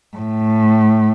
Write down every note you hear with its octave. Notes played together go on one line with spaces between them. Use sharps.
A2